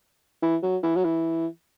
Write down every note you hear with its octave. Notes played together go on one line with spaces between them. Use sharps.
E3
F#3
E3
F#3
E3